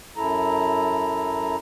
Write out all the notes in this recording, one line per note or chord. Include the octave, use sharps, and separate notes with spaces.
F#2 E4 A4 A#5